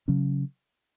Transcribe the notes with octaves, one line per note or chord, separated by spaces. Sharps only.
C#3 F#3 C#4